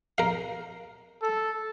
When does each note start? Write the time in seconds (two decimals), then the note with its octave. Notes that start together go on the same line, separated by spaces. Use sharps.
0.18 A#4 F5
1.23 A4